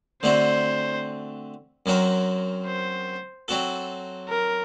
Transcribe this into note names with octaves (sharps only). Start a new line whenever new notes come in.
D3 A3 C4 F#4 C5
F#2 F#3 C4 F#4 A#4
C5
F#3 C4 F#4 A4
A#4